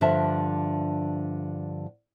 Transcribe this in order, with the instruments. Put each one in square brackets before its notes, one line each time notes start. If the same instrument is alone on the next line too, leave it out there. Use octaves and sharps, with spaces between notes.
[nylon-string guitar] G2 D3 F3 G3 E5 A5